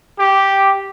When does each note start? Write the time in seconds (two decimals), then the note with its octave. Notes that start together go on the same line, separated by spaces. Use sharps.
0.19 G4